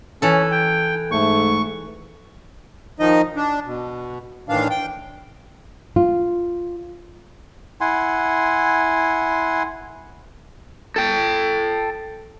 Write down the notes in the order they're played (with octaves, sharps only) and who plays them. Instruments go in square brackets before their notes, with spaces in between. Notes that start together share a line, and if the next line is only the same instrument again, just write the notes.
[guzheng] E3 A4 [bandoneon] C#4
[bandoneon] G5
[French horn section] G#2 A3 [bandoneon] C#6
[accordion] D#3 F3 D#4 D#5
D4
B2
A2 D#3 E3 D4 F5
G5
[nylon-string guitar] F4
[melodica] E4 F#5 G#5 C6
[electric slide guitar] A4 G5